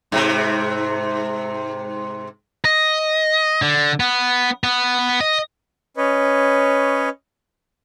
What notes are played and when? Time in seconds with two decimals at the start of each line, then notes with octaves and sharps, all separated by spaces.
0.12 G#2 C3
2.65 D#5
3.62 D3
4.00 B3
4.64 B3
5.21 D#5
5.97 C#4 B4 C#5 D#5